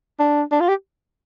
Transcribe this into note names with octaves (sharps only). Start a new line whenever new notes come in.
D4
D4
F4
G4